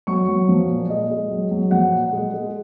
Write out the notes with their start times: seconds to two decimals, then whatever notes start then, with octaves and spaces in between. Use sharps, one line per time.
0.07 F#3 C#6
0.28 F#3
0.49 F3
0.69 A#2
0.89 G#3 D#5
1.10 G#3
1.31 F#3
1.51 F#3
1.71 F3 F#5
1.92 A#2
2.12 G#3
2.34 G#3